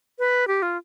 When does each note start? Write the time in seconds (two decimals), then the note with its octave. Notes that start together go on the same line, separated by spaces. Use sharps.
0.19 B4
0.47 G4
0.62 F4